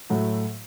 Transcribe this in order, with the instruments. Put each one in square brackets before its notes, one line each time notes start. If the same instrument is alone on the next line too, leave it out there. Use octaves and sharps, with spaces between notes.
[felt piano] A2 F#3 A3 F#4